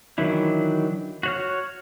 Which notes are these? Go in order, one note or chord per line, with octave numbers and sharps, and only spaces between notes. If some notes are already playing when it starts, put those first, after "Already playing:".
D#3 E3 F#3 D4 E4
F#4 C#5 F6